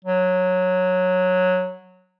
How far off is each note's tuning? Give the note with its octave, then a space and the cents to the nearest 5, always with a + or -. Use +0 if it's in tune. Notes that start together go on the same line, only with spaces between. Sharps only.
F#3 -10